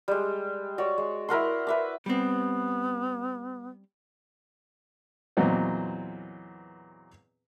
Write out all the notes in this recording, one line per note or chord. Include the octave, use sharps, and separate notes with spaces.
G3 G#3
F#4 C#5 D5
G#3
E4 A#4 F#5 C6
B4 E5 D6
G3 B3 C4
E2 A#2 F#3 B3 C4 D#5